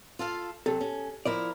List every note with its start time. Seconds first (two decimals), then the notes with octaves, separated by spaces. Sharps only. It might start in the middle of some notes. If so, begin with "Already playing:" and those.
0.19 F4 A4 F5
0.66 C3 F#3 A4
0.81 C#4
1.26 F3 E4 A#4 D5